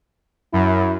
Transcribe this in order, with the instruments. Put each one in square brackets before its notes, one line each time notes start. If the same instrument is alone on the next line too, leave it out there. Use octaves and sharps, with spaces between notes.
[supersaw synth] F#2 [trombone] E4